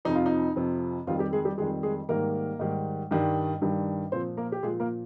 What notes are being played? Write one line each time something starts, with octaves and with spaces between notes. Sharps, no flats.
F2 C3 F3 D#4
F4
D#4
F2 C3 F3
F2 D#3 F3 G3 F4
G3 G4
G#3 G#4
G3 G4
F2 D#3 G3 G#3 G#4
G#3 G#4
G#2 D#3 G3 A#3 A#4
G#2 D#3 G3
G2 D#3 G3
G2 D#3 G3
A#2 F3 C4 C5
A#3 A#4
G4
A#2 F3 G#3 G#4
A#3 A#4